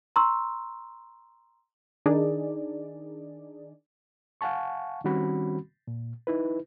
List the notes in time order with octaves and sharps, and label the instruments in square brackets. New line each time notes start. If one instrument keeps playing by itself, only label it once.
[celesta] A#5 C6 C#6 E6
[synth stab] D#3 D4 D#4 G#4 D5
[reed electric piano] F5 F#5 G#5 A5 C#6
D#3 G3 C4 C#4 F#4 B5
A#2
D#4 E4 B4